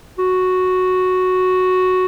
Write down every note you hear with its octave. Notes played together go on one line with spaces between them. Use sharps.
F#4